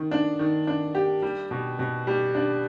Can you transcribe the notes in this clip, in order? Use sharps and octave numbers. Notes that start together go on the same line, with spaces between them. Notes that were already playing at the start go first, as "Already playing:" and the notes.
Already playing: D#3
D4
D#3
D4
G4
G3
B2
B2
G3
D4